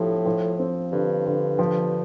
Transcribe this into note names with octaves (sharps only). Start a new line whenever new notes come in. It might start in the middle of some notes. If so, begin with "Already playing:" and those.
Already playing: A2 F3 G4
F3
C4
G2 D3
D3
F3